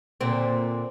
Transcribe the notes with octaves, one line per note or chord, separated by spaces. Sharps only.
A#2 D3 C4